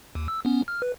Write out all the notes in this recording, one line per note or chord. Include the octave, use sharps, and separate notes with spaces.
D#2
E6
B3 C#4
F6
B4